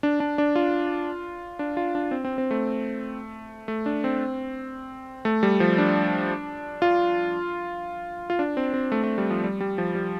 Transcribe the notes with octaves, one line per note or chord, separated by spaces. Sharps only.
D4
D4
D4
F4
D4
F4
D4
C4
C4
C4
A3
A3
D4
C4
A3
G3
F3
D4
F4
F4
D4
C4
C4
A3
A3
G3
F3
G3
G3
F3
G3